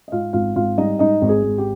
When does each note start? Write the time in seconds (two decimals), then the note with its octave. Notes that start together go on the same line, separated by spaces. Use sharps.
0.08 D#5
0.12 G#2 F4 F5
0.33 G#1 F4 F5
0.56 G#1 F4 F5
0.78 G3 D#4 D#5
0.99 G#2 D#4 D#5
1.22 G#1
1.29 G#4
1.43 G#1
1.58 G4